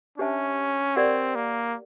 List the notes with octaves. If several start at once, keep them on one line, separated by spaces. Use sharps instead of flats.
C#4 D4 G4 C5 E5 A5
C4 G4 A#4 D5 F#5
A#3